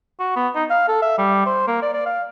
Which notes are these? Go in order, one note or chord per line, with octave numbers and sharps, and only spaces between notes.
F#4
B3
D#4
F5
A4
E5
G3
C5
A#3
D5
D5
F5